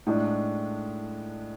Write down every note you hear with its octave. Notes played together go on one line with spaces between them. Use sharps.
A2 G#3 D4